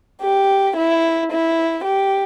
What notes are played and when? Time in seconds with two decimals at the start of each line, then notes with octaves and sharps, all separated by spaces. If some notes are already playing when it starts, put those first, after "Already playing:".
0.22 G4
0.75 E4
1.31 E4
1.84 G4